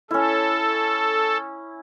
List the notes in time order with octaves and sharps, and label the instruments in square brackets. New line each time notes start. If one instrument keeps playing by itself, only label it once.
[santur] C#4 E4 [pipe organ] A4